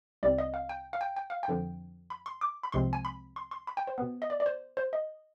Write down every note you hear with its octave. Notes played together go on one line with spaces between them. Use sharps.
C2 C3 G3 C4 D5
D#5
F5
G5
F5
G5
G5
F5
G5
F2 D3 F3
B5
C6
D6
B5
C2 C3 F3 G#3 C4 C6
G#5
B5
C6
C6
B5
G5
C5
B2 B3
D#5
D5
D5
C5
C5
D#5